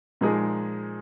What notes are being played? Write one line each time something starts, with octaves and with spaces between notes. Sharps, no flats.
A#2 F3 G#3 D#4 G#4